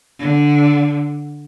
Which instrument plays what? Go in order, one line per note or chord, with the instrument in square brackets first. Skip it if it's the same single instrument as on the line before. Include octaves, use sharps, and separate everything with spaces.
[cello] D3